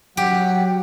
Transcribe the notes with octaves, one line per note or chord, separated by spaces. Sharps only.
F#3 G4 F#5